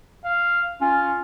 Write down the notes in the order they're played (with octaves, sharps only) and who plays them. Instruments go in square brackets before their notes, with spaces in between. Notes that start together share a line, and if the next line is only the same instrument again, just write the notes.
[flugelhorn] F5
[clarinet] C#4 [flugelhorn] F4